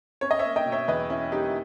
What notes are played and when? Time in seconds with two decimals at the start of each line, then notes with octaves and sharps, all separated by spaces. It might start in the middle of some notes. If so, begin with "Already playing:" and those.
0.21 C#4 C#5
0.31 D#5
0.39 C#5 E5
0.45 A#3
0.56 D#5 G5
0.66 B2
0.72 C#5 E5
0.88 E2 B4 D#5
1.10 C#4 E4
1.32 A#3 D#4 G4
1.48 E4